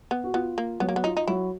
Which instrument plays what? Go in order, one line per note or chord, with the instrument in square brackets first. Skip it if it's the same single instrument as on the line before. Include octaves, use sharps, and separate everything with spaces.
[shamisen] B3
[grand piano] F#4
[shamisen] B3 [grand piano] F4
[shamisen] A#3
[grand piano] F#3 F#4 [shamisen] B3
[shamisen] A#3
B3
[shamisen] D#4 [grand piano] F4
[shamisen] D#4
[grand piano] F#3 F#4 [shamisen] E4